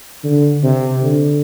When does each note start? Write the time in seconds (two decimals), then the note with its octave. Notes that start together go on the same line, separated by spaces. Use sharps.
0.24 D3
0.63 C3
1.01 D3